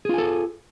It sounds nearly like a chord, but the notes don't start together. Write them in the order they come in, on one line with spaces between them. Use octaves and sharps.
G#4 F4 G#5 A4